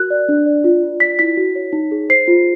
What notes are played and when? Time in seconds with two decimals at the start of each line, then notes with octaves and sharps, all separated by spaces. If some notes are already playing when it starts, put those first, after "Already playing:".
Already playing: F#4 A#4 F#6
0.11 D5
0.29 D4
0.46 D5
0.64 F4
0.83 F4
1.00 D5 B6
1.19 E4 B6
1.37 F#4
1.55 C#5
1.73 D#4
1.91 G#4
2.09 C5 C7
2.28 F4